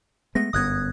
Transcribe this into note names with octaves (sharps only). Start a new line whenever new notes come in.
G#3 A3 B3 A#6
G1 F#2 B3 D#6 F#6 G#6